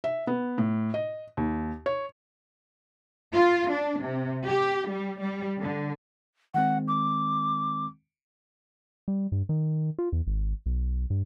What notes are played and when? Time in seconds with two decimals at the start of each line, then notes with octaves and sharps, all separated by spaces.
0.04 E5
0.27 B3
0.58 A2
0.94 D#5
1.37 D#2
1.86 C#5
3.33 F4
3.72 D4
4.03 C3
4.48 G4
4.88 G3
5.21 G3
5.59 D3
6.54 D#3 G#3 C4 F#5
6.88 D6
9.08 G3
9.32 G2
9.49 D#3
9.99 F4
10.12 E2
10.27 G#1
10.66 B1
11.10 G2